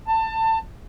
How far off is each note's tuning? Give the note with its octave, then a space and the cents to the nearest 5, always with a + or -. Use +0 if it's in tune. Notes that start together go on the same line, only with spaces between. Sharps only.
A5 +25